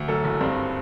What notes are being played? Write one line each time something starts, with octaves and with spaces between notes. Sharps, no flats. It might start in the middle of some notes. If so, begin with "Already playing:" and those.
Already playing: D2
F#2 A4
F#1
G2 C4